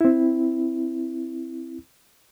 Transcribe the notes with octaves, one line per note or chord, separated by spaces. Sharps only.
C4 E4